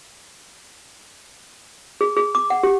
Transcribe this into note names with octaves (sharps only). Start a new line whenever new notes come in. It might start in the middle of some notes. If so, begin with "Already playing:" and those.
G#4
G#4
D6
F#5
G4